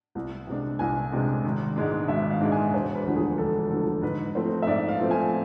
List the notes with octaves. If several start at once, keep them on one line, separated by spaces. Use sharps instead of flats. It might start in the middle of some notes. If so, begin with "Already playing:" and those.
C2
C3 G#3 D4
C2 G#5
C3 G#3 D4
G#1
G#2 G#3 D4
G#1 E5
F5
G#2 G#3 D4
G#5
E1 C5
B4
D2 D3 F3
G#4
E1 A4
D2 D3 F3 A4
G#2 B4
F3 A3 C4 C5
E5
G#2 D5
F5
F3 A3 C4
G#5